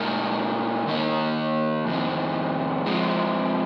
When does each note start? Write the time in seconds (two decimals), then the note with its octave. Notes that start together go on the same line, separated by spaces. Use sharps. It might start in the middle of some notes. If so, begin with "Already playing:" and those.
Already playing: A#2 G#3 D#4 A#4
0.87 D#3 A#3 D#4 A#4
1.87 F2 D#3 C4
2.86 F3 G#3 C4